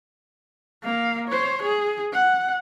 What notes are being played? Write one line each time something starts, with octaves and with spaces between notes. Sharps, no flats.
A#3 F5
C5 C#5
G#4
F#5